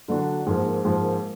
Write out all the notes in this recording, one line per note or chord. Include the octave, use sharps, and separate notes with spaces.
D3 F#3 D4 F#4
G#2 F3 A#3
G#2 F3 A#3